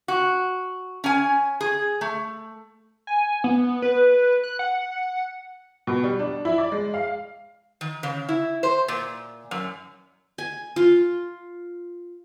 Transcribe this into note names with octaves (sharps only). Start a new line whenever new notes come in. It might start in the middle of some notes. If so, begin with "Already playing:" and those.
F#4
C#4 G#5
G#4
A3
G#5
B3
B4
F#6
F#5
B2
G3
D4
E4
D5
G#3
F5
D#3
C#3
E4
C5
A#2
F#2
G#5
F4